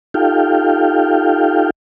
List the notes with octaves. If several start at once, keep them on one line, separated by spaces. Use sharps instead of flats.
D#4 F4 G4 A4 F5 G5